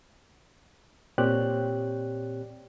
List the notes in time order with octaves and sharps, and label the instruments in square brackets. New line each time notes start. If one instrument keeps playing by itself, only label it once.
[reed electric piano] A#2 C4 G4 C#5 D5 F#6